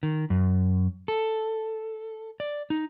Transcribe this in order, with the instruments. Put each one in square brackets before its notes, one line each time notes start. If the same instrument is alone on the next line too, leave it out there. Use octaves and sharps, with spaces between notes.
[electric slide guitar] D#3
F#2
A4
D5
D#4